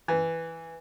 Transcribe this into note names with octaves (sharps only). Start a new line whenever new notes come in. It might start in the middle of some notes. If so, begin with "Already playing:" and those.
E3